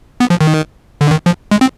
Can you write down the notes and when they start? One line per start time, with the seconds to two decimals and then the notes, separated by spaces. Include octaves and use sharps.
0.20 B3
0.30 F3
0.41 D#3
1.01 D3
1.11 D#3
1.26 F3
1.51 G#3
1.61 C4